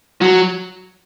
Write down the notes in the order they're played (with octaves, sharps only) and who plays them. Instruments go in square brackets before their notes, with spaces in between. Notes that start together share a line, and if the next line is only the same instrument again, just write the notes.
[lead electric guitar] F#3